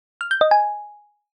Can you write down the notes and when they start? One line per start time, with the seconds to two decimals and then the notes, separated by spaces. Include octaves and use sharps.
0.21 F6
0.31 G6
0.41 D#5
0.51 G#5